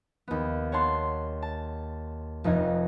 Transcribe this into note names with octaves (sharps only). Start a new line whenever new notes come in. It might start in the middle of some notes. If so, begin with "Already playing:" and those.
D#2 B3
C#5 F#5 A5 C6
A5
F1 F2 D#4 D#5 G#6